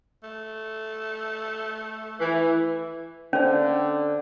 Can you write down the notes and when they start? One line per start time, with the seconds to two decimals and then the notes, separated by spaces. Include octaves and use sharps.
0.23 A3
2.20 E3
3.33 D3 C#4 C5 D5 F5